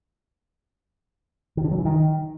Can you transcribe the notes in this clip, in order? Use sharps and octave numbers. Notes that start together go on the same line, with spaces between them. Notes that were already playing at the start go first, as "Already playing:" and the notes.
D#3
D3
F#3
E3
D#3